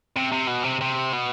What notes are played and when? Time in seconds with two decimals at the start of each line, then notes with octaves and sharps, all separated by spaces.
0.16 C3
0.32 C3
0.48 B2
0.64 C3
0.81 C3
1.13 B2